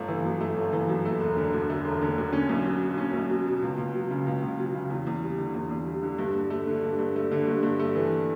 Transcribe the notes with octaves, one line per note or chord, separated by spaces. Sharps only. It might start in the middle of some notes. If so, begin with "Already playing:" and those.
Already playing: G1 A3
E3
F#2
A3
G1
E3
F#2
A3
E1
D3
D2
A3
E1
D3
D2
C#4
B1
F#3
B2
C#4
B1
F#3
B2
C#2
C#2
F#3
C#3
C#2
C#2
F#3
C#3
E2
E2
G3
D3
E2
E2
G3
D3
G2
G2
A3
D3
G2
G2
A3
D3
G2
G2
A3
E3